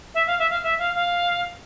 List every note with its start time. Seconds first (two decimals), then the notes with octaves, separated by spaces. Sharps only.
0.14 E5
0.26 F5
0.38 E5
0.50 F5
0.63 E5
0.78 F5
0.95 F5